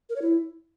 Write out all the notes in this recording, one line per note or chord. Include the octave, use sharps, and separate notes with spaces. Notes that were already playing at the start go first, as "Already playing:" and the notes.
A#4
C#5
E4